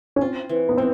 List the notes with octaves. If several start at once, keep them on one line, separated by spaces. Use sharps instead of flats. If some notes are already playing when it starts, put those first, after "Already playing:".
C#4
C4 F4
E3
B3
E3 C4